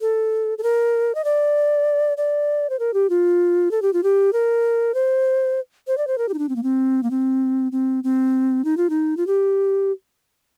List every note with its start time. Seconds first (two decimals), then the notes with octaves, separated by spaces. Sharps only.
0.01 A4
0.58 A4
0.63 A#4
1.15 D#5
1.24 D5
2.17 D5
2.70 C5
2.79 A#4
2.94 G4
3.10 F4
3.71 A4
3.82 G4
3.93 F4
4.03 G4
4.33 A#4
4.94 C5
5.87 C5
5.98 D5
6.07 C5
6.18 A#4
6.29 G4
6.34 D#4
6.39 D4
6.49 C4
6.56 A#3
6.63 C4
7.03 A#3
7.11 C4
7.72 C4
8.04 C4
8.65 D#4
8.77 F4
8.90 D#4
9.17 F4
9.27 G4